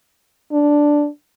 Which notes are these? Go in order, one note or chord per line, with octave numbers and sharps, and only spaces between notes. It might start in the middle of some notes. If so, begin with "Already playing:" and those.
D4